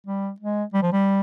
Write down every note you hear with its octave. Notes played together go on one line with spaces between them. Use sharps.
G3
G#3
G3
F3
G3